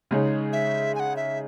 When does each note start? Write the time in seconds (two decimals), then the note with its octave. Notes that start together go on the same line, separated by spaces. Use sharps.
0.11 C#3 G#3 D#4 G#4 C#5
0.53 E5
0.95 G#5
1.00 F#5
1.16 E5